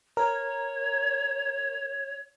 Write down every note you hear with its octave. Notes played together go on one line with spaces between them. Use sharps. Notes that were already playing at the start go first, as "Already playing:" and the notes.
A#4 C#5